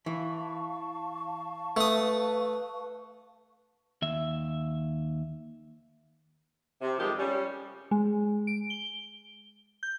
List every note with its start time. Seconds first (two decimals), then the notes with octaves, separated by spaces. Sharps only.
0.06 E3 F5 A5 C#6
1.77 A3 B4 D#6
4.02 D#2 E5
6.82 C3
6.98 F2 D#3 F3 G3 G#3 G4
7.18 G3 C#4
7.91 G#3
8.47 D7
8.70 G7
9.83 G6